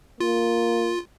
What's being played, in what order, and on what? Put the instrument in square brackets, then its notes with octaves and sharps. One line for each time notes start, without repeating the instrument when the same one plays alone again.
[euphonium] A#3 [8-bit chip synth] F4